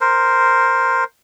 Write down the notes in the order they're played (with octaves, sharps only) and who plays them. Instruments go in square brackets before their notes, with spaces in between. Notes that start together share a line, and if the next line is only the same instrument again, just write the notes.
[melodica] A#4 C5